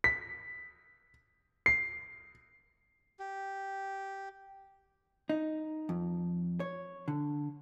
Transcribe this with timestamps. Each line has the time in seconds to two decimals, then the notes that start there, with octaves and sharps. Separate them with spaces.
0.04 B6
1.66 C7
3.19 G4
5.29 D#4
5.89 F2
6.60 C#5
7.08 D3